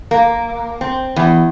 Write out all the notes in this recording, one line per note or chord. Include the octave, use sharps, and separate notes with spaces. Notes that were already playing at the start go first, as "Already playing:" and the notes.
A#3
C4
E2